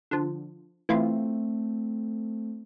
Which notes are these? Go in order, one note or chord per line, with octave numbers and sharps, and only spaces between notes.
D3 F3
E3 A3 C4 E4 F4